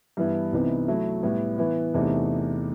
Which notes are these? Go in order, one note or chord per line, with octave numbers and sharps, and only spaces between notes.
G2 E3 B3 E4
C2 C3 E3 B3 D#4
F#3 A3 E4
A2 G3 B3 E4
E3 B3 E4
E2 C3 E3 A3 D#4